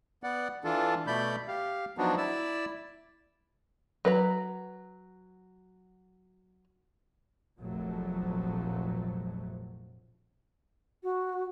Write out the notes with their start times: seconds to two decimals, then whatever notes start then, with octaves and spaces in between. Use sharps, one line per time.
0.23 B3 D5 F#5
0.64 E3 D4 F4 A4
1.07 B2 A3 D5 B5 G6
1.48 G4 F5
1.98 F3 F#3 B3 D4 D#4 F#4
2.17 E4 D5 E6
4.05 F#3 B4 A#5
7.58 F1 A#1 F2 A#2 F#3 A3
11.03 F#4